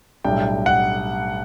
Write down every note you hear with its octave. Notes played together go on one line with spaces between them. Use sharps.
B1 A2 G3 D4 G5
F#5